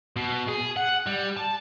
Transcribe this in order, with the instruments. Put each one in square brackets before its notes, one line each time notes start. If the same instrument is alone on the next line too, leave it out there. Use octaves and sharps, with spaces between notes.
[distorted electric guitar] B2
G#4
F#5
G3
A5